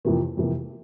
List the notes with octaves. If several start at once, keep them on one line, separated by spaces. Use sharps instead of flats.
F2 C3 E3 A#3
F2 C3 E3 A#3